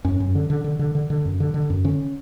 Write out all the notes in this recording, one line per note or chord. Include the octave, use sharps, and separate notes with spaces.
F#2 C#4
F#2
D3
D3
D3
D3
D3
D3
F#2
D3
D3
F#2
D3 C#4